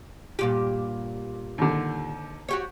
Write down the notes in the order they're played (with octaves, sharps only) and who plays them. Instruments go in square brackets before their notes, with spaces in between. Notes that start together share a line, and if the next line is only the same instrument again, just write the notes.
[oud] G2 A#2 G4
[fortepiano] D#2 D3
[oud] F#4 G4 C#5